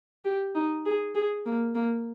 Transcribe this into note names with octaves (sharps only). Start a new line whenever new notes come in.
G4
D#4
G#4
G#4
A#3
A#3